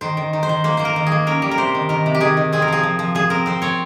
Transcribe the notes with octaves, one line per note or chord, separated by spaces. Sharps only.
D#3 C5
D#3
D#3
C5
D#3
A#3 C5
A#3 C5
A#4
D#3
G#4
A#3
C#4 A#4
G3
A#4
C3 C5
D#3
D#3 A#4
C3
G4
D#3 G#4
D#3
C4 G#4
A#4
F3 G#4
F3
F3
F3 G#4
C4 A#4
C4 C5
C4 C#5